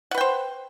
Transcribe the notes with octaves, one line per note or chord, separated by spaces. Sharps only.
B4 C5 F#5 G5